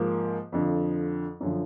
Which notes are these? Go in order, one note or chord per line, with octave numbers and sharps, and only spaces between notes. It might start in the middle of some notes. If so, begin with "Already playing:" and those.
Already playing: G#2 F3 A#3
F2 D3 F3
F#2 D3 F3